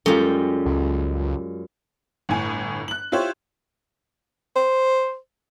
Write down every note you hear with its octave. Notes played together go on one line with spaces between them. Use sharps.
F#2 G3 G#3 F4 A4
C#2
G1 A2 G#5
F#6 F#7
E4 F4 G4 C5 C#5
C5